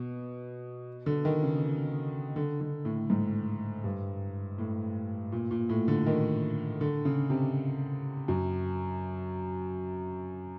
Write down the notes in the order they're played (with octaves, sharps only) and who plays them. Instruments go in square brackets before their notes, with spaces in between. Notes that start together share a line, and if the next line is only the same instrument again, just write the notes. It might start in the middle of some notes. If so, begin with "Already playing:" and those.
Already playing: [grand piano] B2
D3
D#3
C#3
D3
D3
A2
G#2
G2
A2
A#2
A#2
A2
D3
D#3
D3
C#3
C3
F#2